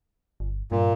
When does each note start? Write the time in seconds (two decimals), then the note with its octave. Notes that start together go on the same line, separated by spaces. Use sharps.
0.40 G1
0.72 G2 A#2